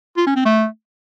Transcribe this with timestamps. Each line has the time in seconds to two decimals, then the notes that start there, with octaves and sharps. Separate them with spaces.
0.17 F4
0.27 C#4
0.36 C4
0.45 A3